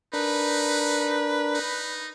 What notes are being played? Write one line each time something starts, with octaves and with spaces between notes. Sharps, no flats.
D4 D#4 A#4 B4
D#4